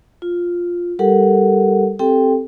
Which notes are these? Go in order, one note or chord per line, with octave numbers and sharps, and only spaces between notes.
F4
G3 G4 A4 A#4 F#5
C4 G4 A4 G5